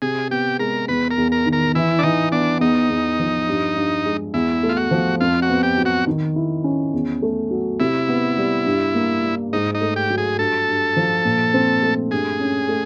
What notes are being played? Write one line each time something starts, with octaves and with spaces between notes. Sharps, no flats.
C3 G#4
B3 G4
G#3 A#4
E2 B4
A#4
E2
A#4
D#3
A#4
E3 E4
D4
E3 D#4
B3 D4
E2 D#4
E2
F3
G2
G2
G#3
E2 E4
A3
F4
F#4
F3
F2 F4
F#4
B3
G4
F#3
F#4
D#3
E4
C#4
E2
A3
F#3
C3 E4
B3
G3
G2
A#3
G3
G#2 D#4
D#4
A3
G4
F#3
G#4
G2 A4
G2
F3
A#2
C4
A3
G2 G#4
C#4
A3